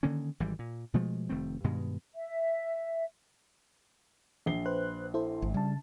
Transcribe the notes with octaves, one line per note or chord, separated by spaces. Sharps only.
D3 D#3 A#3 C#4
G#1 E3 G3
A#2
B2 F3 G#3 A3
F1 D#3 A3 C4
G2 B2 D#3 G#3
E5
A#1 C7 G7
B4 C5 F#6
E4 A4 C5
G#1
C#3 G3 A5